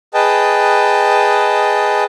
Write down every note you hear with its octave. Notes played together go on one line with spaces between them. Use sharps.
G#4 B4 D#5 G5 A5